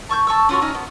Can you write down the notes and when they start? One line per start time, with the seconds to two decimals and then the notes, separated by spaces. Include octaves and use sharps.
0.09 A5 C#6 F6 G6
0.27 A5 C#6 E6
0.49 C#4 F4 F#4 C#5
0.61 C#4 D#4 D#5 F6
0.74 B3